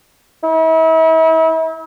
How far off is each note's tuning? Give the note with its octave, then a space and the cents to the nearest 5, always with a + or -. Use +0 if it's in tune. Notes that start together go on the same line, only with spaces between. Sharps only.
E4 -40